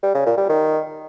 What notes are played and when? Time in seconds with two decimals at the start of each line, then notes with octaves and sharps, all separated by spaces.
0.03 G3
0.14 C#3
0.26 A#2
0.37 G3
0.49 D#3